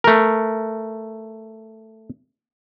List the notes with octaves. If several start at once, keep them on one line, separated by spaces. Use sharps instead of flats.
A3 A#4